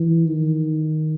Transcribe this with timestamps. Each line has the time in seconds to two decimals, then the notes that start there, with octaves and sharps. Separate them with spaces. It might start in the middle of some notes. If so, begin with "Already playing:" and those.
Already playing: E3
0.26 D#3